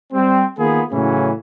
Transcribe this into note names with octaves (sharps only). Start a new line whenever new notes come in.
G3 C4
D#3 A#3 B3 F4 G#4
A2 C#3 E3 F#3 C#4